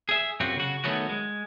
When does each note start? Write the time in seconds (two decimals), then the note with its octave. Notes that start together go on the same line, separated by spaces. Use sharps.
0.09 G#4 E5
0.40 F#2 C3 C4 F4 F#4
0.57 C#3 F#4
0.84 D#3 F#3 A3 B3 C#4 F#4
1.09 G#3